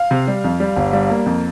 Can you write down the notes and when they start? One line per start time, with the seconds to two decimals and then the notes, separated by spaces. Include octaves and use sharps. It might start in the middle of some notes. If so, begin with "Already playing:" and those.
Already playing: F5
0.11 C3
0.27 G3
0.44 F2
0.60 G3
0.76 G1
0.93 G3
1.10 A#3
1.26 F2